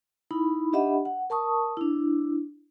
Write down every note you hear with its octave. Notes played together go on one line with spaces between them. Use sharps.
D#4 E4 B5
D4 G4 D#5 E5 F#5 B5
F#5
A#4 A5 C#6 D#6
D4 E4